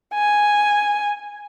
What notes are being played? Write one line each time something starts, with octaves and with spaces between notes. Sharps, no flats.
G#5